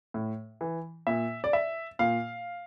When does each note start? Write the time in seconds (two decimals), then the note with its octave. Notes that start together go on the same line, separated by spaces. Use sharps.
0.14 A2
0.61 E3
1.07 A#2 E5
1.44 D5
1.53 E5
1.99 A#2 F5